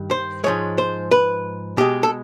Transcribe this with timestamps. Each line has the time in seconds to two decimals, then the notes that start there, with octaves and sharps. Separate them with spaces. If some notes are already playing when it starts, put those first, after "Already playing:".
Already playing: G2 D#3
0.11 C5
0.44 G#2 F3 G#3 C#5
0.78 C5
1.11 B4
1.77 B2 G#3 G4
2.03 A4